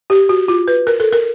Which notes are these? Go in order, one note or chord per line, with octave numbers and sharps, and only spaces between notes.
G4
F#4
F4
B4
A#4
A4
A#4